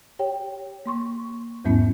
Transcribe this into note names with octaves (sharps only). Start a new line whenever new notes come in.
G4 C#5 G5
A#3 C6 C#6
E2 G#2 F#3 B3 C#4 E4